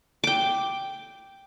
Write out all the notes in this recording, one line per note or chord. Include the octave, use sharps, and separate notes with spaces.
G5 D6